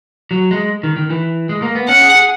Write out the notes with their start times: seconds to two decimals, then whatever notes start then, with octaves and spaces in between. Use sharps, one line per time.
0.31 F#3
0.51 G#3
0.83 D#3
0.97 D#3
1.10 E3
1.49 G#3
1.62 A#3
1.75 B3
1.88 C#4 F#5
2.02 G#4
2.15 G#4